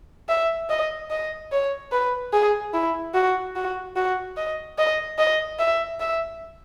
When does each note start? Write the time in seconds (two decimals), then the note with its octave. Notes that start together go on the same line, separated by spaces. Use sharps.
0.29 E5
0.70 D#5
1.11 D#5
1.52 C#5
1.92 B4
2.33 G#4
2.74 E4
3.14 F#4
3.56 F#4
3.96 F#4
4.37 D#5
4.78 D#5
5.19 D#5
5.59 E5
6.00 E5